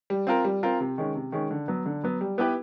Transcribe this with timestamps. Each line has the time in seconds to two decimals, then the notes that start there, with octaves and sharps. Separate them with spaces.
0.10 G3
0.27 C4 F4 A#4
0.45 G3
0.63 C4 F4 A#4
0.80 C3
0.98 D#3 G#3 C#4
1.15 C3
1.32 D#3 G#3 C#4
1.51 D3
1.68 F#3 B3
1.86 D3
2.03 F#3 B3
2.21 G3
2.38 B3 E4 G4 B4